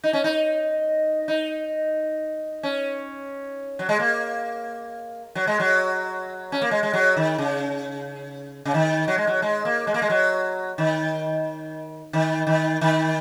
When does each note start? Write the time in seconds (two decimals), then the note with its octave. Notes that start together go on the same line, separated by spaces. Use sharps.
0.03 D#4
0.13 C#4
0.24 D#4
1.28 D#4
2.63 C#4
3.79 F#3
3.89 G#3
3.99 A#3
5.35 F#3
5.47 G#3
5.60 F#3
6.52 C#4
6.62 A#3
6.71 G#3
6.83 G#3
6.93 F#3
7.16 D#3
7.38 C#3
8.65 C#3
8.74 D#3
9.08 F#3
9.18 G#3
9.27 F#3
9.42 G#3
9.65 A#3
9.87 G#3
9.94 A#3
10.02 G#3
10.10 F#3
10.78 D#3
12.13 D#3
12.47 D#3
12.81 D#3